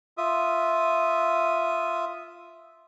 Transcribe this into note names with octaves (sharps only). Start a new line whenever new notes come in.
F4 E5 D#6